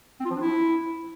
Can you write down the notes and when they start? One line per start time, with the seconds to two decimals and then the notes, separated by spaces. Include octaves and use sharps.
0.20 C4
0.25 F4
0.31 F3
0.36 D4
0.41 E4